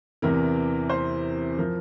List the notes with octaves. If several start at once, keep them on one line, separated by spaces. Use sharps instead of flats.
E2 C3 E3 A#4
C5
F3 A#4